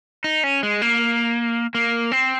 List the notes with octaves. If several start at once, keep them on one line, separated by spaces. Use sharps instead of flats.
D#4
C#4
G#3
A#3
A#3
C4